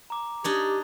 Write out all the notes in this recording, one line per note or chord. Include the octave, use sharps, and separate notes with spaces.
A#5 D6
D4 D#4 G4 C#5